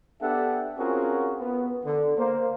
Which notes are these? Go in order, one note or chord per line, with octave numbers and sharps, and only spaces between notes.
B3 D4 G4 A4 E5 F#5
C4 C#4 F4 F#4 G#4 A#4
B3
D3
A#3 C5